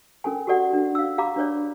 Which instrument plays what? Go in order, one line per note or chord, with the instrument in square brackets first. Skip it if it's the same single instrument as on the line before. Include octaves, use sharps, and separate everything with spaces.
[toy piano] C#4 A4 A#4 G#5
F#4 G4 A4 D5 F#5
D4
F5 E6
G4 F5 A#5 B5 D6
D4 B4 C#5 D5